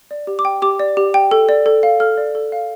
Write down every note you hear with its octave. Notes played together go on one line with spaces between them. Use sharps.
D5
G4
D6
G5
G4 D6
D5
G4
G5
A4
D5
A4
F5
A4 F6
D5
A4
F5